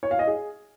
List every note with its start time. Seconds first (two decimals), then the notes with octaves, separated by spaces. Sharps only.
0.03 C#5
0.11 F5
0.19 D#5
0.27 G#4